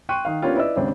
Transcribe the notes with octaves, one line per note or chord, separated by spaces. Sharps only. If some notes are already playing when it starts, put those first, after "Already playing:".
G5 C6 C#6 F#6 D#7
D#3 F5
A#3 B3 C#4 D4 F4 G4
E4 B4 D5 D#5 E6
D#2 G#2 C#3 C4 D4